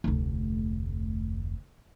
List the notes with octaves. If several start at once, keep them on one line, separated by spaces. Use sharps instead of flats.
F1 D2